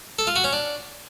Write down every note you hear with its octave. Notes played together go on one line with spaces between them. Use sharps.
A4
F4
F#4
C#4
D4